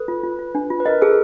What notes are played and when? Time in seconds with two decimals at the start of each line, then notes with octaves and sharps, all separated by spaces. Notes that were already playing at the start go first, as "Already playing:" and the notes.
Already playing: A4 B4
0.08 F4
0.23 F4
0.39 F4
0.55 D4
0.70 F4
0.80 B4
0.86 A#4 D#5
1.02 G#4 A4